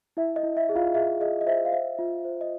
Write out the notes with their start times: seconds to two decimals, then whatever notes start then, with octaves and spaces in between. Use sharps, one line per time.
0.17 E4 E5
0.36 D#5
0.43 E4
0.57 E5
0.69 G#4
0.75 F4 F5
0.94 G#4 E5
1.20 G#4 D#5
1.41 D#5
1.46 C5 E5
1.65 F5
1.72 C5 E5
1.99 F4
2.25 C5
2.41 D#5